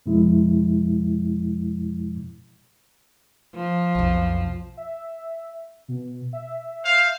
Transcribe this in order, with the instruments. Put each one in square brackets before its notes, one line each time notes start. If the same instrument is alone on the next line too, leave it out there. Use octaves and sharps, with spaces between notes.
[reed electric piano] F2 B2 F3 G#3 E4
[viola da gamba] F3
[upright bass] B1 F2
[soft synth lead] E5
B2
E5
[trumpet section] C5 F5